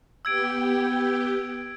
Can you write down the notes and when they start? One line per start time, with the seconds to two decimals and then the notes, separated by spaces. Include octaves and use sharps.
0.25 B3 G4 G5 E6 G#6 D7